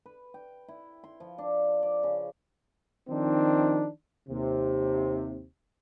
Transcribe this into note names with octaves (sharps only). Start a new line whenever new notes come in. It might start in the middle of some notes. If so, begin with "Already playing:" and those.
B4
G5
E4
C6
F3
D4
D5
C#3
D#3 F3 C4 D4 D#4
D#2 C3